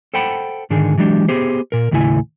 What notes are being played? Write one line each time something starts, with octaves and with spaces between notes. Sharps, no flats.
A4 C5 F#5 G5 A5 B5
G#2 D3 D#3 G#4
E3 F#3 G#3 D4 G4
B3 G4 G#4 C5
A#2 A#4
D#2 A2 C#3 E4 G#5